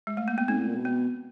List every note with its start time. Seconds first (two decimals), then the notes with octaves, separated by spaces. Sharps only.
0.07 G#3
0.17 A3
0.28 A#3
0.38 B3
0.48 G#2 C4
0.58 A2
0.67 A#2
0.76 B2
0.85 B3